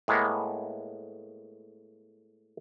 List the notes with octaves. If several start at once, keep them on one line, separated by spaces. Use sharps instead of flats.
A2 G#3 A#3 B3